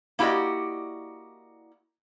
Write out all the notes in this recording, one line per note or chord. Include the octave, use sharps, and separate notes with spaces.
A#3 E4 F#4 G4 D5 D#5